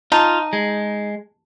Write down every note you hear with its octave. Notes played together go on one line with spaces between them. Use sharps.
D#4 F4 A5
G#3